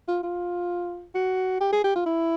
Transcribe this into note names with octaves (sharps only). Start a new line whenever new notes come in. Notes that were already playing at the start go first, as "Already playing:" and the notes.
F4
F4
F#4
G4
G#4
G4
F4
E4